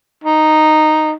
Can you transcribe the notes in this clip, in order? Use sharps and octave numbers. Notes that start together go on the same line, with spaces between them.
D#4